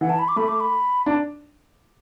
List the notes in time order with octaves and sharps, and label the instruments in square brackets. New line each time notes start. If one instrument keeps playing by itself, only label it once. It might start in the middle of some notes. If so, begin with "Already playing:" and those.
[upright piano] E3 [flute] F#5
[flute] A5
B5
D6
[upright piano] A3 [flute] B5
[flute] D6
B5
[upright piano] D4 [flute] A5